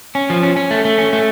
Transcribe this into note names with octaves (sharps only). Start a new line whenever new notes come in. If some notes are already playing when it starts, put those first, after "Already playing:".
C#4
F3
C#4
C#4
A3
A3
C#4
A3